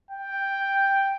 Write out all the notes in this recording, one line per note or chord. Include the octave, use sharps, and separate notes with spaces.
G5